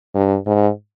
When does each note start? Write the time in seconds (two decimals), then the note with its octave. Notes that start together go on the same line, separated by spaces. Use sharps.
0.15 G2
0.46 G#2